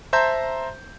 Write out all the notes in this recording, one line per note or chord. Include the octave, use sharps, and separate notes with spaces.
C5 E5 A5 A#5 C6 G6